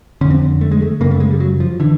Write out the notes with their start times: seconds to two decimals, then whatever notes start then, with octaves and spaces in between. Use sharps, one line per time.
0.21 D3 C#4
0.25 F2
0.31 C4
0.61 A3
0.72 G#3
0.82 A3
1.01 F#2 C#3 A#3
1.11 A3
1.20 G#3
1.31 G3
1.40 F#3
1.60 F3
1.80 D3 E3